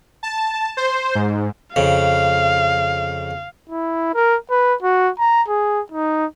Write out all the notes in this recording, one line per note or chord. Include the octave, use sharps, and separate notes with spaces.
A5
C5
G#2
F2 C#3 F5
E4
A#4
B4
F#4
A#5
G#4
D#4